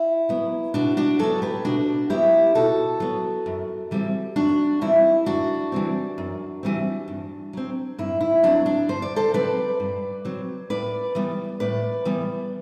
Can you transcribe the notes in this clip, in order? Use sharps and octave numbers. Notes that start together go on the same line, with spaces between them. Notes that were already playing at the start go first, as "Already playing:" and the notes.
Already playing: E4
F#3 B3
B2 D4 F#4
D4 F#4
F#3 B3 F#4 A4
G4 B4
B2 D4 F#4
F#3 B3 E4 G4
B2 F#4 A4
F#3 B3
F#2
E3 G3 C4
F#2 D4 F#4
E3 G3 C4 E4
F#2 D4 F#4
E3 G3 C4
F#2
E3 G3 C4
G2
F#3 C4
G2 E4
E4
F#3 C4 D4
D4
G2 C5
D5
A4 C5
F#3 C4 B4 D5
G2
F#3 C4
A2 B4 D5
E3 G3 B3
A2 B4 D5
E3 G3 B3